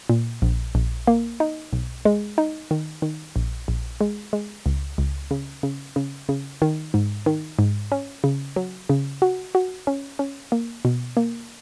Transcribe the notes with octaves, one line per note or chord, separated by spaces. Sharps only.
A#2
A#1
A#1
A#3
D#4
B1
G#3
D#4
D#3
D#3
A#1
A#1
G#3
G#3
C#2
C#2
C#3
C#3
C#3
C#3
D#3
G#2
D#3
G#2
C#4
C#3
F#3
C#3
F#4
F#4
C#4
C#4
A#3
B2
A#3